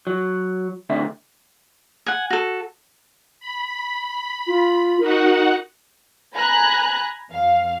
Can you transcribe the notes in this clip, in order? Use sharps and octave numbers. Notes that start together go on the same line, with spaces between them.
F#3
D2 D3 D#3 C4 E5
F#5 G#5
F#4 A4
B5
F4
D#4 F#4 A#4 F#5
G#5 A#5 B5 F#6
F2 F5